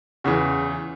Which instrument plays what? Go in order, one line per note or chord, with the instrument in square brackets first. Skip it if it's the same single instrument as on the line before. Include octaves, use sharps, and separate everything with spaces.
[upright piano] E2 C#3 E3